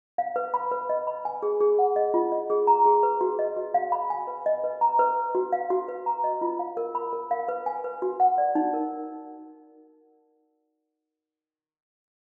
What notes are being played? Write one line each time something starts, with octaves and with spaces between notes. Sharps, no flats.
F5
B4
B5
B4
D#5
B5
G#5
G#4
G#4
F#5
D#5
F4
D#5
G#4
A#5
G#4
B4
F#4
D#5
F#4
F5
B5
G#5
B4
D#5
B4
A#5
B4
B4
F#4
F5
F#4
B4
A#5
D#5
F4
F5
A#4
B5
A#4
F5
B4
G#5
B4
F#4
F#5
D5
D#4
A#4